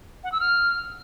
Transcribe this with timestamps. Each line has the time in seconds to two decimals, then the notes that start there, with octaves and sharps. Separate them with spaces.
0.24 F#5
0.32 E6
0.40 F6